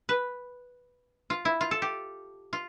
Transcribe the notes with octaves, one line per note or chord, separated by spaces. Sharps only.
B4
F4
E4
F4
A4
G4
F4